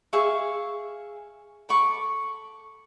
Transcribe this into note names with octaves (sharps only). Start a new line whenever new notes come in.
G#4 E5 F5 C#6
A4 B5 C#6 D6